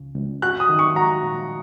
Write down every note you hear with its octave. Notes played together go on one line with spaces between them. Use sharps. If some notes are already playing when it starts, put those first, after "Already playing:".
Already playing: C#2 C#3
C#2
F#4 F#6
D#6
D#3
C#6
F#4 A#5
A#2